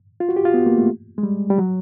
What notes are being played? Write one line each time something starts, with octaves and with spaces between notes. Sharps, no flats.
F4
F#4
G4
F4
B3
A#3
A3
G#3
G3
G3
F#3